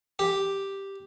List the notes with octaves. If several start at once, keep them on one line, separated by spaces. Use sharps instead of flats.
G4